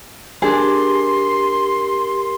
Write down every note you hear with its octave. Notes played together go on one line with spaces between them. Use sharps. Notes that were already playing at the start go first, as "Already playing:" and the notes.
D4 G4 G#4 A#4 C6